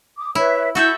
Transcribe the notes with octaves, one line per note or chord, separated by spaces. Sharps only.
D6 D#6
E4 B4 C#5 E5
E4 F#4 A4 E5 G6